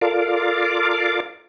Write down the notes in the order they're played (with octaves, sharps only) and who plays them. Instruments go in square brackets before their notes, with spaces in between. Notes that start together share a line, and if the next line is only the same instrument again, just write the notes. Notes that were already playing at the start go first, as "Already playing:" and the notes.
[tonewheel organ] F4 A4 A#4 D5 F5 D6